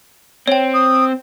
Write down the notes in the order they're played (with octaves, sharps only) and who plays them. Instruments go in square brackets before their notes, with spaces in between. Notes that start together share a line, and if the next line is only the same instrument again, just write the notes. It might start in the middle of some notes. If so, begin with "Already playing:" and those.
[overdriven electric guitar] C4 [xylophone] C#5 G5
[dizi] D#6